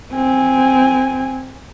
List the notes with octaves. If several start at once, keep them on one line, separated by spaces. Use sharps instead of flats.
C4 G#5